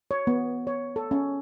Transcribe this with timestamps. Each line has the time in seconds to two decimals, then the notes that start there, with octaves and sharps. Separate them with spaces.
0.11 C#5
0.27 B3
0.67 C#5
0.96 A4
1.11 C#4